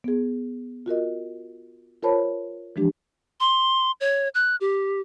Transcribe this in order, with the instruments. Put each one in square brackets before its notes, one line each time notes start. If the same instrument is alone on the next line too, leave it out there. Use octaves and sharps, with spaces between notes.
[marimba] B3 G#4
F4 F#4 A#4 D#5
F4 A#4 C5 C#5 A5 B5
E3 F3 G#3 D4 G4
[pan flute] C6
C#5
F#6
G4